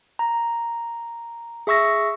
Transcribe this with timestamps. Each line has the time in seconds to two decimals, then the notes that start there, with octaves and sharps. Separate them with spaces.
0.19 A#5
1.67 G#4 E5 C#6 E6 A#6